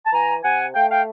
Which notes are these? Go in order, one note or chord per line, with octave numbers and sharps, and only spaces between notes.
A5
E3 G#5 A#5
C3 F#5 G#5
A3 F5 G5
F5 G5